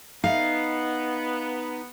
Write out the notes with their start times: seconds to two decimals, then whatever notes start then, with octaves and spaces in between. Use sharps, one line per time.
0.24 B3 D#4 F5